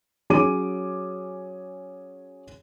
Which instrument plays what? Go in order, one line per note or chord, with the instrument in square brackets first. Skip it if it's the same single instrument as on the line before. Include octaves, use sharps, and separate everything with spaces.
[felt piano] F#3 C#4 G#4 D6 D#7